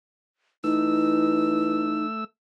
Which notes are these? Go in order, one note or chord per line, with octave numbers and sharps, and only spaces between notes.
E3 A3 D#4 E6